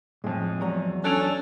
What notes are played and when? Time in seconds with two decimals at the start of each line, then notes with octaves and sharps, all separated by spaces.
0.24 F2 A2 G#3
0.60 E2 F#3 A#5
1.04 C#4 D4 A4 F#6 D7 F7